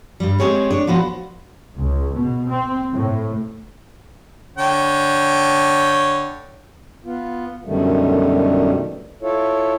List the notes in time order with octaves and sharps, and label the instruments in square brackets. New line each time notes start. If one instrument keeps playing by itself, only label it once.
[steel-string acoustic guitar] G2 G3
G#3 C4 G4 G#4 C#5
D4 C#5
F3 B3 F#4 C5
[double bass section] C#2
B2
C4
A2
[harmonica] D3 C#5 G5
[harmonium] B3 F4
F#2 B2 D3 D#3 G3 A3
E4 F4 A4 C#5